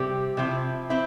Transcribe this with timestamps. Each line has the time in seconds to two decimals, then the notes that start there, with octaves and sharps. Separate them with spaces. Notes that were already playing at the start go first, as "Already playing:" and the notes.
Already playing: C3 G3 C4 G4
0.37 C3 F3 C4 E4
0.90 C4 E4